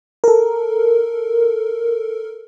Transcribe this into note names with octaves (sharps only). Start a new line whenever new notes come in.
A4 A#4